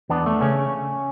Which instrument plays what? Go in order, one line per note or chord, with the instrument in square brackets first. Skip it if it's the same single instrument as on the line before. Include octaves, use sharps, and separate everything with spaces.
[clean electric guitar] E2 B3 D4
A3
C#3 C#4